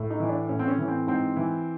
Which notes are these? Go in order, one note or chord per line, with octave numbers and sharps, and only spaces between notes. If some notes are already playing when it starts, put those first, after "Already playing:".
Already playing: A2
D#4
E3
D4
A2 C#4
C4
C#4
E3
C4
G#2 C4
E3